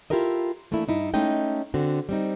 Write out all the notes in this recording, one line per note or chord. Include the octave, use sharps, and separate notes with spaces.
E4 F4 G4 A4 A#4 D#5
E3 A3 A#3 D4 E4
G2 D#4 E4
G#3 A3 C#4 D#4 D#5 G5
D3 C4 F#4
G3 C4 D#4